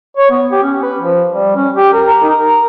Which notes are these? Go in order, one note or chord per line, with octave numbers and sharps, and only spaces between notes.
C#5
B3
G4
C#4
B4
F3
G3
C#4
G4
A#4
D#4
A#4